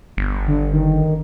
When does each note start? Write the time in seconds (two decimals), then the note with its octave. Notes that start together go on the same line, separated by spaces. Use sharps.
0.17 G1
0.47 D3
0.73 D#3